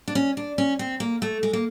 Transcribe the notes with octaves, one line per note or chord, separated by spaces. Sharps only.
D4
C#4
D4
C#4
C4
A#3
A3
G#3
A#3